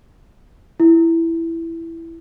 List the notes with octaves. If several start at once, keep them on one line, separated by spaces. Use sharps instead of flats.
E4